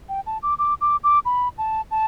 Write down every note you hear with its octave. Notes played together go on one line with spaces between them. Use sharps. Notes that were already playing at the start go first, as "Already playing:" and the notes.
G5
A5
D6
D6
D6
D6
B5
A5
A5